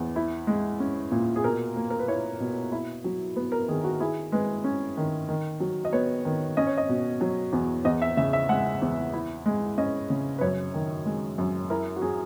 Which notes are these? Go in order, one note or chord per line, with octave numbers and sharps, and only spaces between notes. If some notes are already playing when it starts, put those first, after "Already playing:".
Already playing: E2
E4
G#3
C#4
A#2
G#4
B2 A#4
A#3
A#4
B4
E4 C#5
B2
E4
F#3
B3 B4
A#4
D#3 G#4
F#4
E4 G#4
G#3 B4
C#4
D#3
D#3
F#3
D#5
B3 C#5
D#3
C#4 D#5
C#5
D#5
B2
F#3
E2
E2 D#5
E5
C#3 E5
E5
G#3 F#5
E2
E4
G#3
C#4 D#5
C#3
B4
F#2 C#5
D#3
G#3
F#2
E4 A#4
F#4
F#3 G#4